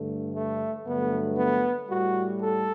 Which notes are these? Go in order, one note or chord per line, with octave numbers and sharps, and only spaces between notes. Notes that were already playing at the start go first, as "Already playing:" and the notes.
Already playing: G2 D3 A3
A3
G2 D3 F#3 A3 B3
B3
A2 G3 F#4
A4